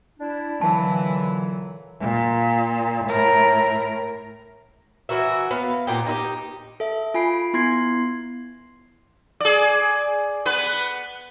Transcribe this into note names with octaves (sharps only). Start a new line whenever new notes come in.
D4 E4
A#2 D3 E3 F#3 A5
A#2
A2 A#4
E3 F#4 A#4 E5
B3 F5
A#2 B3 D#4 G4
D#4 E4 G4
A4 E5
F4 G#5 B5 C7 D7
B3 E4 C6 G#6 C7
G#4 D5
B3 B4